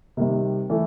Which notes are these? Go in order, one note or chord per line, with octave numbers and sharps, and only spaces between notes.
C3 D#3 G3
E3 A3